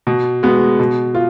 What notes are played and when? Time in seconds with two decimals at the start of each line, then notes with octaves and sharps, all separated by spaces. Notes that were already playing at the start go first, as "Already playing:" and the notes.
0.07 B2
0.43 G#3 B3 F#4
0.80 B2
1.15 F4